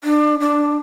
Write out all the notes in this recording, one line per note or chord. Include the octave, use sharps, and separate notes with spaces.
D4
D4